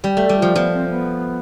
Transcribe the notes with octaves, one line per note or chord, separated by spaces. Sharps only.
G3
A3 A4
G3
F3 F4
F3 B3
C4
B3